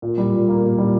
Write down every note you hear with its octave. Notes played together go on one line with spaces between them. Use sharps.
A#2
G3
A#2
A#3
A#2
G3